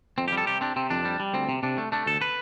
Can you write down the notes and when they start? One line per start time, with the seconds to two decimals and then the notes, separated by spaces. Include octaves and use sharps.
0.18 F2 C4
0.28 G4
0.32 G3
0.37 A4
0.47 C3 G4
0.61 C4 D4
0.76 C3 C4
0.90 F2 D4
1.05 G3
1.20 G3
1.34 D2 C4
1.49 C3
1.63 C3 D4
1.78 A3
1.92 A3 D4
2.06 D2 A4
2.21 B4